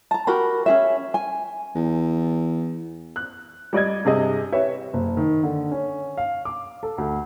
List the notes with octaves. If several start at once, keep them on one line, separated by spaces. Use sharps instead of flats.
A5 A#5
F#4 G4 A#4 B5
C#4 G#4 E5
G#5
E2
F#6
G3 D5 D#5 G#6
G2 C3 G#4 D#5
G4 B4 C#5 E5
F#1
D#3
D3
C#4
F5
D6
A4
D2